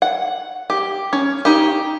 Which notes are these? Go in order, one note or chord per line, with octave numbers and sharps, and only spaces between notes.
F#5
G4
C#4
D#4 G4